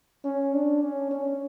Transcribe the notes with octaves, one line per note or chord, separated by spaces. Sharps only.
C#4
D4
C#4
C#4